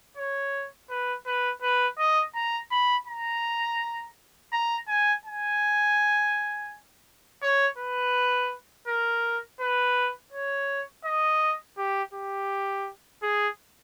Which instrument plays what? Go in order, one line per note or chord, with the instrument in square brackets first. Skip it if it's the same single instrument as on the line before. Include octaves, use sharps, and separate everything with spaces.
[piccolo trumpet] C#5
B4
B4
B4
D#5
A#5
B5
A#5
A#5
G#5
G#5
C#5
B4
A#4
B4
C#5
D#5
G4
G4
G#4